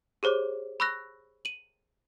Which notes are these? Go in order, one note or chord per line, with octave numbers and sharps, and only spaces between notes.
G4 G#4 C5 C#5 D6
B5 C#6 E6 F#6 A#6
D#7 F#7